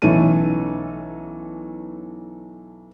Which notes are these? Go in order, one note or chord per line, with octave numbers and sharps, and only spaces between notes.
B1 E3 A3 C#4 A4 D#7